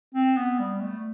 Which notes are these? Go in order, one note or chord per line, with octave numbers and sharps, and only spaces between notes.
C4
B3
G3
A3